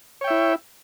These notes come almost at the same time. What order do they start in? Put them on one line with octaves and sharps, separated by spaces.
C#5 G5 E5 E4